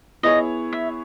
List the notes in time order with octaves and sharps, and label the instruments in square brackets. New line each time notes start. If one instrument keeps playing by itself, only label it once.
[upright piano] B3 E4 G#4 C#5 [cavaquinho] D#5
[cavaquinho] E5